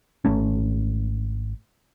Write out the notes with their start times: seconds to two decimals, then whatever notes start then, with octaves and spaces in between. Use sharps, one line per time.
0.25 G#1 A3 C#4